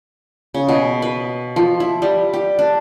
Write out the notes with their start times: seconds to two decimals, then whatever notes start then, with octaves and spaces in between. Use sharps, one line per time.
0.54 C#3
0.69 B2
1.02 B4
1.56 F3
1.80 E4
2.02 G3
2.34 G4
2.59 D4